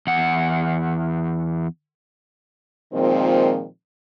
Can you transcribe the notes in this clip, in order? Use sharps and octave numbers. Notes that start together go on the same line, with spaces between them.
E2 F#5
A#2 D#3 F3 G#3 C4